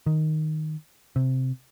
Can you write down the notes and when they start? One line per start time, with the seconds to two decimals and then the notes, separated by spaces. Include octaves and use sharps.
0.06 D#3
1.16 C3